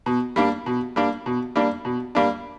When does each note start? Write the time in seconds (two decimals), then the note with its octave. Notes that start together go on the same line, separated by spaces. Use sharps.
0.06 B2
0.36 G3 A#3 D4
0.66 B2
0.96 G3 A#3 D4
1.26 B2
1.56 G3 A#3 D4
1.85 B2
2.15 G3 A#3 D4